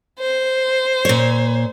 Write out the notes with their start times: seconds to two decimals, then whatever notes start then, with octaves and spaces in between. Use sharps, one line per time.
0.19 C5
1.05 A#2 C#5